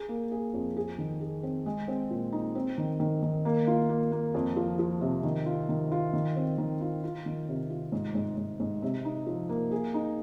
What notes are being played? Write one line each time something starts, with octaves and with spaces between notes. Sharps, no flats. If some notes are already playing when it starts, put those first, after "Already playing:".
Already playing: G#4
A#3
G#4
F2
G#4
D#3
G#4
C4
G#3
C4
A#2
D#4
C4
D#3
D#3
D#3
A#3
F4
A#3
A#3
F2
F3
F3
C3
D#3
F4
D#3
F4
D#3
C4
D#3
F4
F4
D#3
C3
F4
G#2
G#2
G#2
G#2
C3
D#4
F3
A#3
G#4
D#4